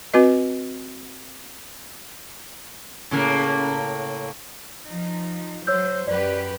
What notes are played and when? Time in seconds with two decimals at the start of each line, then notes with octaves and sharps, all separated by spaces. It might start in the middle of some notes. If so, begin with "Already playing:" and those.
0.14 C4 F#4 B4 D#5
3.11 A2 C#3 A#3
4.86 F3 D#4
5.67 F#3 C5 C#5 E6 G6
6.07 F#2 G4 B4 D5